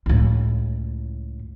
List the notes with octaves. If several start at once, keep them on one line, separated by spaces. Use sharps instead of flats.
C#2 A2